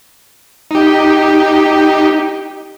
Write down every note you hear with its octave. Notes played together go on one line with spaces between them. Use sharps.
D#4 G4